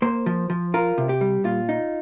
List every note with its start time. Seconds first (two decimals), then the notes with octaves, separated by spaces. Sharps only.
0.02 A#3 C5
0.26 F3
0.50 F3
0.74 F4 A#4
0.98 C3
1.09 G4
1.21 G3
1.44 A#2 F4
1.69 D#4